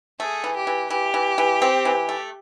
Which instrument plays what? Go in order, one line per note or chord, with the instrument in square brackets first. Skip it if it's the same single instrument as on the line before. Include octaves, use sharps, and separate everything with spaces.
[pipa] A3 [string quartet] G#4
[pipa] E3
[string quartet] G4
[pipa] E3
[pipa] E3 [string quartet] G4
[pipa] E3
E3
C4
E3
A3